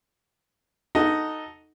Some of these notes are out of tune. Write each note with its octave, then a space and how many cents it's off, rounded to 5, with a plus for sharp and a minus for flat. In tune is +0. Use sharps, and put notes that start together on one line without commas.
D#4 +0 F#4 +0 A4 +0